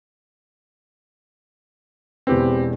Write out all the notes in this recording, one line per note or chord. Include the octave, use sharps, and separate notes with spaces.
E1 E2 C4 G4 B4